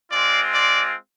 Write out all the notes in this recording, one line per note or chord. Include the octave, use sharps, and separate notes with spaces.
G#3 C4 F4 D5
D5